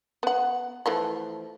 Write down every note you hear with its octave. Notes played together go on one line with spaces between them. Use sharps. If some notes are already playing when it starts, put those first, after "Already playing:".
B3 F#5
E3 F3 A3